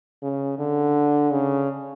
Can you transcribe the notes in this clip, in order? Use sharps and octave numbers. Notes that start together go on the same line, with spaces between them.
C#3
D3
C#3